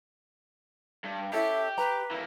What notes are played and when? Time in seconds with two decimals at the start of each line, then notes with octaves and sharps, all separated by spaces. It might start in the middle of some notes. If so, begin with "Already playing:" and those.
1.04 G2
1.33 C#4 E4 G4 A4 E5
1.78 B4 A#5
2.11 E3 A#3